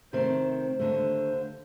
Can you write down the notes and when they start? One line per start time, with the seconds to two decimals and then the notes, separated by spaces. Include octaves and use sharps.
0.13 C3 D#3 A3 C4 C5
0.79 D#2 D3 A3